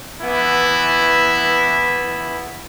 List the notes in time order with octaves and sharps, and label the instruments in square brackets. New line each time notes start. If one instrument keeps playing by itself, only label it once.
[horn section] E3 B3 E4